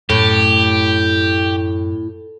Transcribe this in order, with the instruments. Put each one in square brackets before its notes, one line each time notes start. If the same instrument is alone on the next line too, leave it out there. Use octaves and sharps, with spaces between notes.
[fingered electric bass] F#2 [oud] A2 [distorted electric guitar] G4